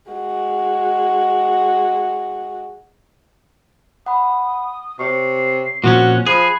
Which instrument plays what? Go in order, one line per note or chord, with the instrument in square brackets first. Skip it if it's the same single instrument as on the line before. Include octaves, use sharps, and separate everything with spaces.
[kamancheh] G#3 F#4
[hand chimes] F#5 B5 [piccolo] D#6
[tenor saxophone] C3 [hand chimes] C#5 C#6 [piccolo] C7
[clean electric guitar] A#2 F3 C#4 [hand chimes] C4 [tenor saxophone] F#4 [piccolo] F#6
[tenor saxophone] F3 [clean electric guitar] G#4 [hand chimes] B5 F#6 G#6 [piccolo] C7